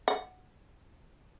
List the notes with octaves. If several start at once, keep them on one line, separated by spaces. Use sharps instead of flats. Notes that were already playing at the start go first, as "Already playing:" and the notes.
F#5